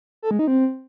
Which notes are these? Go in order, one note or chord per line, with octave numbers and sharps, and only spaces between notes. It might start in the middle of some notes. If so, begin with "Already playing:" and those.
A4
G#3
D#4
C4